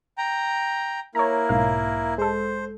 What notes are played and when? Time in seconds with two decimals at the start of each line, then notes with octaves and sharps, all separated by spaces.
0.18 G5 A#5
1.15 A#3 E4 A#4 C#5 A#5
1.49 B1 G#2 F5
2.18 G#3 A4 C5